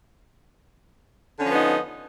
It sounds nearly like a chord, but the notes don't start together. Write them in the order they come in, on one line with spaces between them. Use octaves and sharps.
D3 C#4 F3 B3 D#4